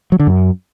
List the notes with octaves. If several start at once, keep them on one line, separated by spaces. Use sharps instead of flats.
F#3
D3
F#2